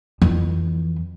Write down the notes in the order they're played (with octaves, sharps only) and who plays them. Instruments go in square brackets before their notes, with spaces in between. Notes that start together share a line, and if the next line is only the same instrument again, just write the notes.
[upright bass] F2 E3